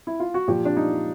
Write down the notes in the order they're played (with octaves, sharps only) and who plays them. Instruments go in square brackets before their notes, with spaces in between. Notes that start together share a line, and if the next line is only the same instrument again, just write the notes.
[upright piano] E4
F4
F#4
A#2 F3 G4
D4
D#4